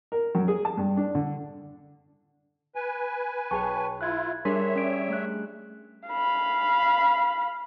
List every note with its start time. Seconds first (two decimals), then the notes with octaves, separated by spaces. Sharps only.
0.12 A#4
0.35 F#2
0.48 G#4
0.65 A5
0.77 G2
0.97 D4
1.15 D3
2.75 B4 G#5
3.51 B1 G#4 C#5 G5 A5 C#6
4.01 E4 F4 F#6 G#6
4.45 G3 D4 G#4 A#4 C#5 E5 C6 B6
4.76 C#4 D5 D7
5.09 A3 F#6
6.09 F5 B5